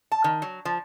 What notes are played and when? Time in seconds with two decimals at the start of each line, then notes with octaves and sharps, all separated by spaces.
0.12 A5
0.24 D#3
0.42 F#3
0.65 F3